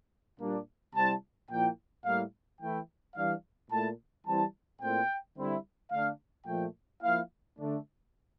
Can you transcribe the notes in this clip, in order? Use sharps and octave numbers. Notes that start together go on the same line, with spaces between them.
A#2 G3 A#3 D4
C3 G3 C4 E4 A5
A#2 F3 A#3 E4 G5
A2 G3 A#3 E4 F5
E3 A3 E4 G5
E3 G3 D4 F5
A#2 A3 E4 A5
E3 G3 C4 E4 A5
A#2 A3 C4 E4 G5
D3 G3 C4 E4
D3 A3 D4 F5
A#2 F3 A3 G5
F3 A#3 E4 F5
D3 A3 D4